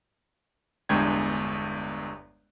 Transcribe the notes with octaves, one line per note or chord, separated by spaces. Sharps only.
G1 E2 G2 G#3 G5 G#6